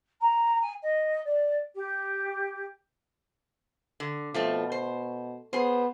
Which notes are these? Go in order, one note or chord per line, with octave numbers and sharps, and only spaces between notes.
A#5
G#5
D#5
D5
G4
D3
B2 F3 A3 C4
C5
B3 G#4 C5